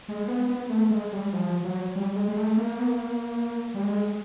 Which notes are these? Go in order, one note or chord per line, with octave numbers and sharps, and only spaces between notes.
G#3
B3
B3
A3
G#3
G3
F3
F#3
G3
G#3
G#3
A3
A#3
B3
A#3
G3
G#3